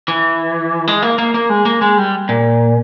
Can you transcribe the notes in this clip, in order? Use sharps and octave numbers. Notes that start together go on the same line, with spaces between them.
E3
G#3
A#3
A#3
A#3
G#3
A#3
G#3
G3
A#2